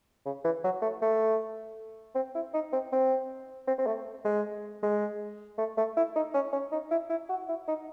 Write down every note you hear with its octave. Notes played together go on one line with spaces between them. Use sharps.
C#3
E3
F#3
A3
A3
C4
E4
D#4
C4
C4
C4
C4
A3
G#3
G#3
A3
A3
E4
D#4
C#4
C#4
D#4
E4
E4
F#4
E4
D#4